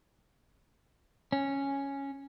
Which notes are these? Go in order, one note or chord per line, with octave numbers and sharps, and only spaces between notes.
C#4